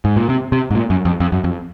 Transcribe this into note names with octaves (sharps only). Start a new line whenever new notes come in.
G#2
A#2
C3
C3
G#2
A#2
F#2
F2
F2
F#2
F2